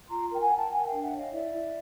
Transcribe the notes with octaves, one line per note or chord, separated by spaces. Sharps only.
F4 A#5 C6
A#4 G5
F#5 G#5
A#4
G5 A5
A#4 F#5 G#5
F5 G5
D4
E5 F#5
C#5 D#5 F5
E4 D5 E5
E4